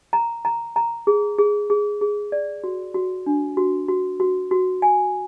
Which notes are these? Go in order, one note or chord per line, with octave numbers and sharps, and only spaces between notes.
A#5
A#5
A#5
G#4
G#4
G#4
G#4
D5
F#4
F#4
D4
F#4
F#4
F#4
F#4
G#5